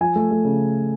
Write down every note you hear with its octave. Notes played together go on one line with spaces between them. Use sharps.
F3 G#5
A3
A3
C#3